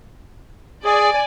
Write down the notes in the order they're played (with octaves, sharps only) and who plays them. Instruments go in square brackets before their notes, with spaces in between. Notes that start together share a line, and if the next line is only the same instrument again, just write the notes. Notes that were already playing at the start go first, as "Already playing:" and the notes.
[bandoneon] G#4 [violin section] D5 G#5